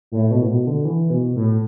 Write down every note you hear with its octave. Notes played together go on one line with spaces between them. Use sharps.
A2
B2
A2
B2
D3
E3
B2
A2